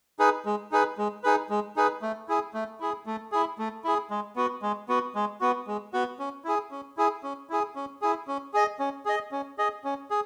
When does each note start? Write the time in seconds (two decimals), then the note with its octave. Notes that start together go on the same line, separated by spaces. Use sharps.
0.19 D#4 G#4 B4
0.45 G#3
0.72 D#4 G#4 B4
0.98 G#3
1.24 D#4 G#4 B4
1.50 G#3
1.76 D#4 G#4 B4
2.02 A3
2.28 E4 G#4
2.54 A3
2.80 E4 G#4
3.06 A3
3.32 E4 G#4
3.58 A3
3.84 E4 G#4
4.10 G#3
4.36 B3 F#4
4.62 G#3
4.89 B3 F#4
5.15 G#3
5.41 B3 F#4
5.67 G#3
5.93 B3 F#4
6.19 C#4
6.45 E4 G#4
6.71 C#4
6.97 E4 G#4
7.23 C#4
7.50 E4 G#4
7.75 C#4
8.02 E4 G#4
8.28 C#4
8.54 G#4 D#5
8.79 C#4
9.05 G#4 D#5
9.32 C#4
9.58 G#4 D#5
9.84 C#4
10.11 G#4